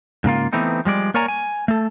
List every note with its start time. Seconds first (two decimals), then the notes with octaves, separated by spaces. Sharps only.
0.24 G#2 C#3 A#3 F4
0.53 E3 A3 B3 C4 D#4
0.85 F3 G3 G#3 D5
1.14 A#3 A#4 C#5 D5 G#5 A#5
1.28 G#5
1.68 A3 A4